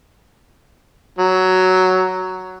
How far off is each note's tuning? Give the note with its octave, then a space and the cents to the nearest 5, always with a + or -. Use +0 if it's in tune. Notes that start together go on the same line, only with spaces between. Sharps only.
F#3 +5